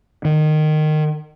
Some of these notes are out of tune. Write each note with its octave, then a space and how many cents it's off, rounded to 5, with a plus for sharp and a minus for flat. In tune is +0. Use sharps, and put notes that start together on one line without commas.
D#3 -20